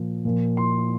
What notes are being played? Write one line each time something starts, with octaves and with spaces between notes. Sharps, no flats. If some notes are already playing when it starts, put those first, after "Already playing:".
Already playing: A#2 F3
A#2 F3
C6